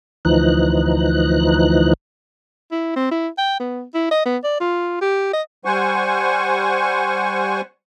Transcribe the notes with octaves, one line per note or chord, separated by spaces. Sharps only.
D2 E3 F3 D#4 F#6
E4
C4
E4
G5
B3
E4
D#5
B3
D5
F4
G4
D#5
G3 C5 F#5 G#5 C#6